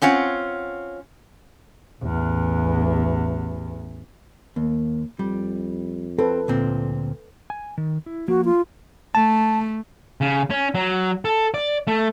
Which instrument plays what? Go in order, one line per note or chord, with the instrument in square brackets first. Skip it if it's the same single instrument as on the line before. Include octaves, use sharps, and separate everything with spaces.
[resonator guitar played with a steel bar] C4 C#4 F4 F#5
[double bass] A1 E2
[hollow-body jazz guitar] D#2 [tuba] A#3
[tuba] F2 [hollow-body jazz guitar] G3
[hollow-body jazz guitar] C4 [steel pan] A4 B4
[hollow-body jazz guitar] D2 A#2 C4
[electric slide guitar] G#5
D#3
E4
[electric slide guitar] F3 A#3 [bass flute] F#4
[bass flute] F4
[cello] A3 [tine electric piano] A5
[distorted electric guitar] C#3
C#4
F#3
A4
D5
A3